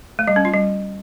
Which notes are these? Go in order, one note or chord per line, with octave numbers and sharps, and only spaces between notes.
A3
G3
C#4
F4
G3